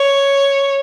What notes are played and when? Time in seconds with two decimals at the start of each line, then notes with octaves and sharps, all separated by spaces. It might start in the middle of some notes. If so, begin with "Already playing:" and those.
Already playing: C#5